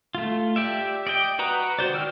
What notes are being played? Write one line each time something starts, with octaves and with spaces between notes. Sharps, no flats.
A3 F4
G4 D5 E5
D5 D#5 G5
F#4 B4 A#5 D#6
F#4 C5 D5
D#3 G5 E6 F6